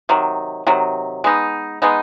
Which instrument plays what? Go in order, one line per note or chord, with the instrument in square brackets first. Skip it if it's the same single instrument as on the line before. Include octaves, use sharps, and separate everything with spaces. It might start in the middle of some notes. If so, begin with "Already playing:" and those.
[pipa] C3 D#3 F#3
C3 D#3 F#3
G#3 B3 D#4
G#3 B3 D#4